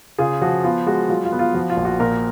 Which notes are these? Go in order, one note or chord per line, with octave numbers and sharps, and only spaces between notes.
C#3 F4 G#4
F3 F#4
B3 F4
G#3 F#4
F#3 F4
F4
B3
F4
F3 F#4
F4
A#1
F#4
A#2 F#4 A#4